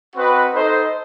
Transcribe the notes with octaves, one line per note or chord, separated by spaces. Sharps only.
C4 F#4 B4 D#5
D#4 A4 C5 D#5